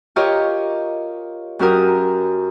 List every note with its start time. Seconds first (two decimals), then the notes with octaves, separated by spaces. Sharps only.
0.16 F4 G4 A#4 C#5 D#5
1.59 F#2 C#4 F#4 G4 A#4 D#6